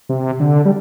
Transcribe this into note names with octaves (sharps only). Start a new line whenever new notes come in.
C3
D3
G3